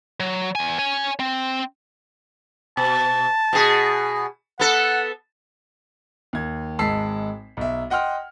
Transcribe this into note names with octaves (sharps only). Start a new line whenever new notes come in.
F#3
E2 G#5
C#5 G#5
C4
B2 A5
B2 G#4
B3 A4 F#5
D#2 G#6
G#1 G#3 A5 E6 B6 C7
B1 E5
D#5 F#5 G5 C6 F6